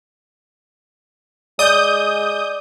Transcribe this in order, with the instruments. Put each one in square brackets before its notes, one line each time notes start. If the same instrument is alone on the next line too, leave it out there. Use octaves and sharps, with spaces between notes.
[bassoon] G#3 [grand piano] D5 [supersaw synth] D#6 G6